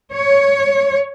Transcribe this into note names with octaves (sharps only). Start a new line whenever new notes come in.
C#5